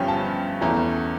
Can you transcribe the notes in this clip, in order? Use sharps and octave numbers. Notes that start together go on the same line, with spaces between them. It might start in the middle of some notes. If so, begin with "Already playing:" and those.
Already playing: G1 G2 F3 C#4 G5
A5
E2 E3 A3 C#4 A#5